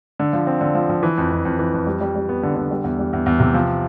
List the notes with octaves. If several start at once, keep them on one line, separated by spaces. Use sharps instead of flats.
D3
F3
C4
D3
F3
F3
E3
F2
F2
F2
E3
F2
G3
G3
G3
B3
D3
D3
G3
E2
G3
E2
E2
C3
F3